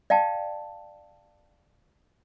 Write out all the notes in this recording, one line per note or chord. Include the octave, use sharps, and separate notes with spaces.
D5 F5 G5 A5